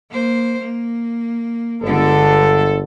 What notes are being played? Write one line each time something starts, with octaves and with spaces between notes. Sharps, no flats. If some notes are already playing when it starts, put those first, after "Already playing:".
A#3 C5
A#3
G1 D3 G#3 A4